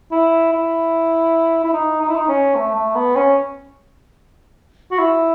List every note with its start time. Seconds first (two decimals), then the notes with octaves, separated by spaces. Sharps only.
0.11 E4
0.52 E4
1.64 E4
1.73 D#4
2.01 D#4
2.08 E4
2.15 D#4
2.28 C#4
2.55 A3
2.75 A3
2.95 B3
3.16 C#4
4.91 F#4
4.99 E4